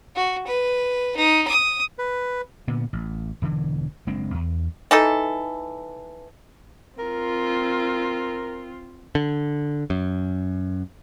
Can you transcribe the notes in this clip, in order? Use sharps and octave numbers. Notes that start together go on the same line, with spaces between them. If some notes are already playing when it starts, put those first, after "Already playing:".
F#4
B4
D#4
D#6
B4
A#2 D3 B3
A1
E1 D3 E3
F#1 G#3 C4 D4
E2
E3 D#4 A4
C4 F4 A#4
D3
F#2